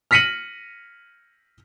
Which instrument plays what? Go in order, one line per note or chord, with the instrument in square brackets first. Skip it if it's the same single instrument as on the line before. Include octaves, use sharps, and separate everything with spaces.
[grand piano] F6 A#6 B6 C#7 D#7 F#7